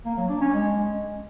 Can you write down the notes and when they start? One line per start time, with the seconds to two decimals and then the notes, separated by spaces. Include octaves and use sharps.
0.05 A#3
0.17 F#3
0.29 D4
0.41 C#4
0.53 G#3